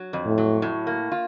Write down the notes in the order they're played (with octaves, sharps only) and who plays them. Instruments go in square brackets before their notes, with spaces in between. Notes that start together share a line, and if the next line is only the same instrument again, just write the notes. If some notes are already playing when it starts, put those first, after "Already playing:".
Already playing: [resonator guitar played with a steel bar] F#3
F2
[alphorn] A2
[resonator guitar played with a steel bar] F#3
A2
A#3
F4